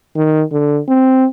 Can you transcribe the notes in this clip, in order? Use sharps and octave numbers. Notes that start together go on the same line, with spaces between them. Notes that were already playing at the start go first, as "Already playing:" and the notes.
D#3
D3
C4